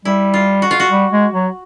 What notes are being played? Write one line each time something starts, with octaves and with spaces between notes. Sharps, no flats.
G3 E4
F4
F#4
F4
F#4
G3
G#3
F#3